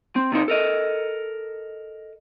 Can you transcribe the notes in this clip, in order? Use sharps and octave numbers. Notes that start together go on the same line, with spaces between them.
C4
C3 C4 D#4
A4 A#4 D#5